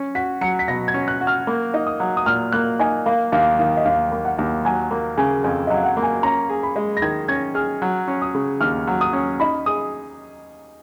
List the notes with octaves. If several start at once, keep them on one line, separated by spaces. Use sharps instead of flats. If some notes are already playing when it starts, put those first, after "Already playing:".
Already playing: C#4
F#4 B6
F#3 C#7
B6
B2 A#6
G#6
C#4
F#6
F#4
F6
A#3
D#4
D#6
F#3
D#6
A#2 F6
A#3 F#6
D#4 G#5
A#3 F5
D#2 F5
D#3 F5
D#5
D#2 F5
A#3
F#5
D#2
F#3 G#5
A#3
C#3 G#5
F2 G#5
D#5
F#3
F5
F#5
A#3
G#5
C#4 A#5
G#4
B5
G#3
A#6
D#3 G#6
C#4 G#6
G#4 F6
F#3
C#4
D#6
C#3
D#2 F6
F#3
D#6
C#4
D#4 B5
G#4 D#6